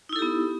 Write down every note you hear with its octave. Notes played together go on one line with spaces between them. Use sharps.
B3 D#4 E4 G4 A4